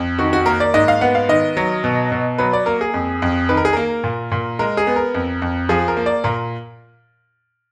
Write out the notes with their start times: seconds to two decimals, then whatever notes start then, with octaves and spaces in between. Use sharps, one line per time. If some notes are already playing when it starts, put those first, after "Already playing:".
Already playing: F2
0.19 D#3 F#4
0.33 F#4
0.46 A#3 A#4
0.60 D5
0.74 G#2 D#5
0.88 F5
1.01 B3 F#5
1.15 F5
1.29 D#3 D#5
1.57 F#3
1.84 B2
2.12 B2
2.38 F#3 B4
2.53 D5
2.66 A#3 A#4
2.81 G#4
2.94 F2
3.22 F2
3.49 D#3 B4
3.57 A#4
3.65 G#4
3.73 A#3 A#4
4.04 A#2
4.32 A#2
4.59 G#3 A#4
4.77 G#4
4.87 B3
4.96 A#4
5.14 F2
5.42 F2
5.69 F3 G#4
5.88 A#4
5.97 A#3
6.06 D5
6.24 A#2 A#4